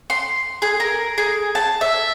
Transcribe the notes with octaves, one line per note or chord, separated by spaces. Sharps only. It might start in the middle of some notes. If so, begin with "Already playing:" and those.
C6
G#4
A#4
G#4
A5
E5